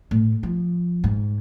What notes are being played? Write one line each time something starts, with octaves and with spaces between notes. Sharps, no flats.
A2
F3
G#2